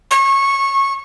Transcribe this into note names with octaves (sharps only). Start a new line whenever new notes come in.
C#6